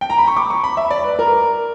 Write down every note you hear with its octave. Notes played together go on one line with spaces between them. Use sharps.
G5
A#5
B5
C#6
D6
C#6
B5
E5
D5
B4
A#4